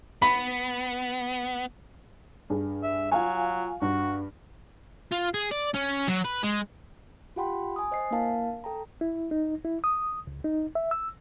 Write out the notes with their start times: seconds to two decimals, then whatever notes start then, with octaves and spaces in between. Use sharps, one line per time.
0.22 B3 B5
2.50 G2 G#4
2.83 E5
3.12 F#3 F4 F5 G#5
3.82 G2 F#4
5.12 F4
5.34 G#4
5.52 D5
5.75 C#4
6.08 F#3
6.25 B4
6.43 G#3
7.36 F4 G4 F#5 G5 B5 C6
7.76 G#5 D#6
7.91 C5 D#5 G#5 C7
8.11 A#3 D4 E4 A#4 F5 A5
8.64 A4 G5 A5 A#5
9.01 E4
9.31 D#4
9.65 E4
9.84 D#6
10.27 C#2
10.44 D#4
10.75 E5
10.91 E6